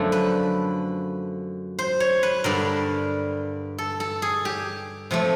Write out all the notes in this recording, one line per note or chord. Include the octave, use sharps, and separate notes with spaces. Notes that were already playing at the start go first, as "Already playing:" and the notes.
Already playing: F#2 D3 F3 A3
B4
C5
C#5
B4
G2 D3 G3 A#4
A4
A4
G#4
G4
C3 F3 A3